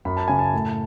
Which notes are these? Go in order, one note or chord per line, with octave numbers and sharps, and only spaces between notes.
F#2 B5
A5
C#3 G#5
A5
A2